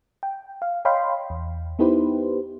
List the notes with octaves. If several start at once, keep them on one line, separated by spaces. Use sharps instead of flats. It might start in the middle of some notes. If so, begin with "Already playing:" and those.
G5
F5
C#5 D#5 F5 G5 B5 C6
E2
B3 D#4 E4 G4 B4 C5